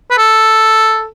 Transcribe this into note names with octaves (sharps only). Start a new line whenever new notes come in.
B4
A4